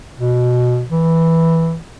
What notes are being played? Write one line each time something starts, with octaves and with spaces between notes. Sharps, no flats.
B2
E3